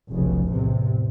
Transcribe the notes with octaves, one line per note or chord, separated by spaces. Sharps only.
F1 B1 C#3
A1 E2 C3